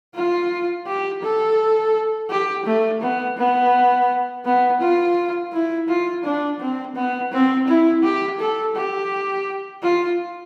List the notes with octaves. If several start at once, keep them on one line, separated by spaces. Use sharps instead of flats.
F4
G4
A4
G4
A3
B3
B3
B3
F4
E4
F4
D4
C4
B3
C4
E4
G4
A4
G4
F4